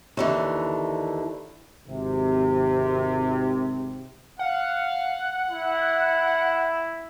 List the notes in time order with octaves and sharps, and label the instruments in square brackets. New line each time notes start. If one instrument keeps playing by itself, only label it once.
[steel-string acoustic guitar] D#2 D3 E3
[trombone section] G#1 C3
[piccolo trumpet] F5 [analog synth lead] F#5
[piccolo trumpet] E4